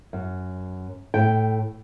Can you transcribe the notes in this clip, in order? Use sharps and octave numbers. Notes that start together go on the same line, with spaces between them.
F#2
A2 G5